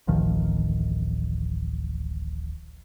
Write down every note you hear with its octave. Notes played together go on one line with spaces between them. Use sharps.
D1 A1 D#3 F3